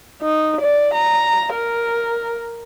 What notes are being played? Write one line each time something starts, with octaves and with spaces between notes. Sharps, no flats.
D#4
D5
A#5
A#4